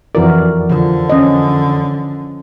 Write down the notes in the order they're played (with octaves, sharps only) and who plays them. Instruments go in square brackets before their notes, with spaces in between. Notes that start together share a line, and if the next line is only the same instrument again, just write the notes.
[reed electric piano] F2 E3 D5 [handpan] F#4 A#4
[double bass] D3 [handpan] F3
[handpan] C#4 D#5